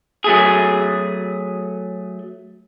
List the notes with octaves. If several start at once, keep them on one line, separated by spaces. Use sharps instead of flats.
F#3 A3 G#4